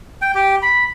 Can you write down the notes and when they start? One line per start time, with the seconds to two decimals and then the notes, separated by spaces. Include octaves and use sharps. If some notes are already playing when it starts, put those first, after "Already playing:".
0.22 G5
0.35 G4
0.62 B5